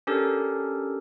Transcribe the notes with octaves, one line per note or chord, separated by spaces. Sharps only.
C#4 D4 G4 A4 A#4